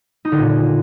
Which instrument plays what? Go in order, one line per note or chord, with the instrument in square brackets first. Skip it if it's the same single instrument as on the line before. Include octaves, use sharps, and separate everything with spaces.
[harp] D#4
D3
A#2